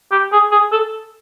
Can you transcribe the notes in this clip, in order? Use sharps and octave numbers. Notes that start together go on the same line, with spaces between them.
G4
G#4
G#4
A4